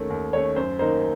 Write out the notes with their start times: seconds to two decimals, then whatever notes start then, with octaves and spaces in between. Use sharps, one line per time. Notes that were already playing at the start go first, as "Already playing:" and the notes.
Already playing: D#2 D#3 A3 C#4
0.10 D#2
0.33 D#3 A3 C#4 C#5
0.56 F#2 C5
0.79 D#3 A#3 D#4 C5